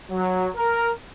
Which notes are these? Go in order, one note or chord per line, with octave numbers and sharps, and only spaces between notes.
F#3
A#4